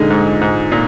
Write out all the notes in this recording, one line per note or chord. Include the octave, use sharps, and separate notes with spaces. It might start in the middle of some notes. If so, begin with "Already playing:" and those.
Already playing: A#2 D3 G#3 D#4
G#2
G#2
A#2